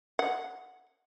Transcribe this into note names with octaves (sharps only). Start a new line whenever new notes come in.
F#5